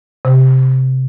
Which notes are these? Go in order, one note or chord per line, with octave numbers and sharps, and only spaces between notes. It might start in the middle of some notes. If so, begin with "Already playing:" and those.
C3